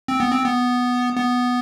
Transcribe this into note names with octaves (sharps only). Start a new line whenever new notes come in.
C4
B3
C4
B3
B3